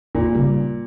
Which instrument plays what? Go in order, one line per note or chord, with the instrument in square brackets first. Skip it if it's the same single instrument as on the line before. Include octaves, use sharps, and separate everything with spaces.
[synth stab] G#1 D#2 [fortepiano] A#2
[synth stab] C#3 G3